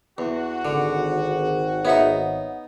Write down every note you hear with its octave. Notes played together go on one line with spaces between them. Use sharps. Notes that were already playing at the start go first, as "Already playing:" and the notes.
E2 F#4
G#1 D3
B3 D#4 C#5 E5 F#5